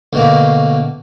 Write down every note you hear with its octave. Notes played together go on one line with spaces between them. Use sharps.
D2 B2 A#3